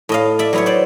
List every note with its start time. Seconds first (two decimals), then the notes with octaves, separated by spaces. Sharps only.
0.09 A2 D#5 F5
0.39 D5 E5
0.53 F#3 B3 E4 C#5
0.66 C5 D5